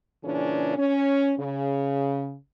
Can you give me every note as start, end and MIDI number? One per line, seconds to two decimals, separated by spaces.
0.23 0.73 46
0.23 0.73 49
0.23 0.73 52
0.23 0.73 61
0.23 0.73 62
0.23 0.73 68
0.77 1.33 61
1.39 2.34 49